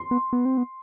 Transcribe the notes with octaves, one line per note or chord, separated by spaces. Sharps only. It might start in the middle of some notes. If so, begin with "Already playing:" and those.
Already playing: C6
B3
B3
C4
B3